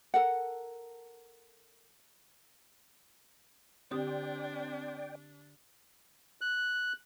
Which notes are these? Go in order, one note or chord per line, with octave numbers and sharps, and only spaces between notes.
A4 A#4 F#5
D3 C4 D4 G4 D5 G5 D#6
F#6